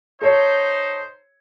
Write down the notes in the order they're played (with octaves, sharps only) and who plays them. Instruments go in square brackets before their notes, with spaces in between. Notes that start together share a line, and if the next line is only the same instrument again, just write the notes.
[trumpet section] D#4 C5 [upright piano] A4 C#5